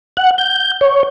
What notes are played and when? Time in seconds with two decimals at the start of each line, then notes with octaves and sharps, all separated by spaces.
0.17 F#5
0.38 G6
0.81 C#5